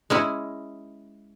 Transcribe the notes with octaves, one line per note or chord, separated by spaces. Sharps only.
G#3 C#4 E4